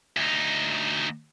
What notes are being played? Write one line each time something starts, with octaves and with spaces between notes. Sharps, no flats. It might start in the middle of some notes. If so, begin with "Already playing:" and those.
D2 D#4